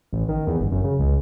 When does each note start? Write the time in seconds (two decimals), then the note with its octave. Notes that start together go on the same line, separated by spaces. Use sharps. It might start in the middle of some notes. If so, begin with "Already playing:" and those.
0.13 A1
0.29 D#3
0.47 E2
0.60 G1
0.72 F#2
0.84 C#3
0.99 C#2